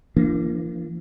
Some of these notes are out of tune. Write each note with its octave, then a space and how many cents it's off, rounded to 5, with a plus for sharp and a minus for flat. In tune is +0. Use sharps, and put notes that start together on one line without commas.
F3 -45 A#3 +0 D4 +0